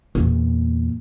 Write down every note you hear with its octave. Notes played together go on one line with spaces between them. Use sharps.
E2 A#2